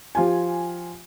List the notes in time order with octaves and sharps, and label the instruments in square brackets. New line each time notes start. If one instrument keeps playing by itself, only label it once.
[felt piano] F3 F4 G4 G#5